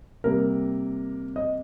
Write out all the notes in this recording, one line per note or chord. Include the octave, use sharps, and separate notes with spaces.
C3 G3 A#3 A#4
D#5